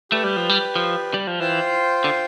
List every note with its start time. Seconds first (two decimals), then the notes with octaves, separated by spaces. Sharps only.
0.11 A3 G4 B4 D5
0.24 G3
0.36 F3
0.49 G3
0.76 F3
1.14 G3
1.27 F3
1.40 E3 F4 C5 G5
2.04 D3